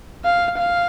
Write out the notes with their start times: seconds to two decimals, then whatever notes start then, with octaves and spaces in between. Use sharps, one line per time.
0.25 F5
0.59 F5